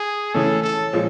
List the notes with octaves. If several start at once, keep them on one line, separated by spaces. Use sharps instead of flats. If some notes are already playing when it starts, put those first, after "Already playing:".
Already playing: G#4
C#3 E3 A3 C#4 A4
A4
A#2 F3 G#3 C#4